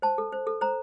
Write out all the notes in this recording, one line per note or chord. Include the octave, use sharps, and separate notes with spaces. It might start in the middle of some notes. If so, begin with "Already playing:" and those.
C5 A5
A4
C5
A4
C5 A#5